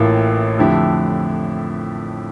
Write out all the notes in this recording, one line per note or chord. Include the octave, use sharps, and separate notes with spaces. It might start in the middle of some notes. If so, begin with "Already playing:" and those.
Already playing: A1 A2 E3 A#3 F4
F2 D3 A3 E4 G4